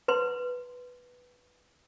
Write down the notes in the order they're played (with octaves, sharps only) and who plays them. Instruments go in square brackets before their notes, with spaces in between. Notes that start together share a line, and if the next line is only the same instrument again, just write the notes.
[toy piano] B4 C6